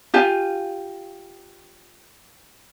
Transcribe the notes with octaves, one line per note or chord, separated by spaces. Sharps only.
F4 G4 F5 G#5